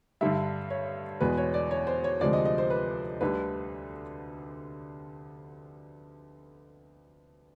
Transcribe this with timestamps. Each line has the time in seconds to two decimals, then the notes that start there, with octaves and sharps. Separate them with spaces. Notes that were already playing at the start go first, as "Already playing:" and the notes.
0.21 G2 D3 G3 E5
0.70 C#5
1.21 E2 B2 G#3 B4
1.37 C#5
1.54 D5
1.71 C#5
1.87 C5
2.04 C#5
2.21 D2 C3 F3 G#3 D5
2.33 D#5
2.45 D#5
2.58 C5
2.70 B4
3.21 D2 D3 G3 B4